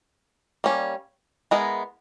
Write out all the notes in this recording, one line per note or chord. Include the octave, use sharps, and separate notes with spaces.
G3 A#3 C#4
G#3 B3 E4 A#4 D#5